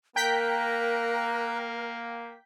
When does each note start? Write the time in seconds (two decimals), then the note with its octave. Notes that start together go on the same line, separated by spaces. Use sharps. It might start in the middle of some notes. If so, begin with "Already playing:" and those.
0.16 A#3 A#4 G5 A#5 F#6 G6 B6